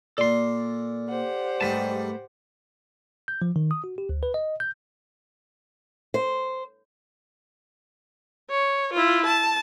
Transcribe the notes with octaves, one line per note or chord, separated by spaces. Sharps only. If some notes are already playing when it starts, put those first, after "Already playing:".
A#2 A#3 A4 D5 C6
G4 C5 F#5
G#2 G3 A3 D#4 B4 A5
G6
F3
D#3
D#6
F#4
G4
D2
B4
D#5
G6
C5
C#5
E4 F4
A5